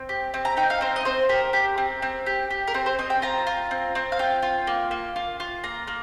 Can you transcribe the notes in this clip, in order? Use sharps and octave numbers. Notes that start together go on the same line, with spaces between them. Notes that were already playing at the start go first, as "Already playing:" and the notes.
Already playing: C4
G4
C4
A#5
D#4 G5
F5
C4 C5
D#5
C4 C5
G4 A#4
G4
C4
C4
G4
G4
A#4
C4 C5
C5
C4 D#5
G5
F4 A#5
F4
C4
C4
F5
F4 G5
F4
A#3
A#3
F4
F4
A#3 A#5
A#3